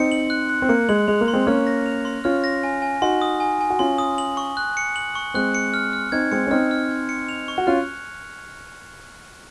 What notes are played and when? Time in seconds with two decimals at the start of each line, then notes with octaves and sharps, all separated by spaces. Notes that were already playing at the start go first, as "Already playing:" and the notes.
Already playing: C4 D#4 C#7
0.12 F#7
0.30 F#6
0.49 F#6
0.62 C4
0.69 A#3 C#7
0.89 G#3 F#7
1.08 G#3 F7
1.21 A#3
1.28 C6
1.33 G#3 C4
1.47 A#3 C#4 F6
1.67 A#6
1.86 F7
2.05 C6
2.24 C#4 F4 F6
2.44 A#6
2.63 G#5
2.82 G#5
3.02 D#4 F#4 C6
3.22 D#6
3.40 G#5
3.61 G#5
3.70 F#4
3.79 C#4 F4 C6
3.98 D#6
4.18 F#7
4.37 C#6
4.57 F#6
4.77 C#7
4.96 F#7
5.15 C#6
5.34 G#3 C4 F#6
5.55 C#7
5.74 F6
5.93 F6
6.12 C4 D#4 G#6
6.31 G#3 C4 C#7
6.47 C#4
6.51 C4 D#4 F6
6.71 F6
6.90 G#6
7.09 C#7
7.29 F7
7.48 C#6
7.58 F#4
7.67 C#4 F4 F#6